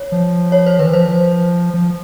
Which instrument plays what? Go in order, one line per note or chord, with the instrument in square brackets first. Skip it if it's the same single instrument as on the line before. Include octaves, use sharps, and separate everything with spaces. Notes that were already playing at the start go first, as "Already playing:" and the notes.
Already playing: [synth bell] C#5
[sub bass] F3
[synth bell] C#5
C5
[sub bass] D#3 [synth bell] B4
[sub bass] E3
[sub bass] F3 [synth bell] C5
[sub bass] F3